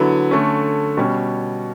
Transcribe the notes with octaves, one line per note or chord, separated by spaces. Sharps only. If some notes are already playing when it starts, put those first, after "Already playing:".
Already playing: D3 F#3 B3 E4
D3 A3 C#4
B2 G3 C#4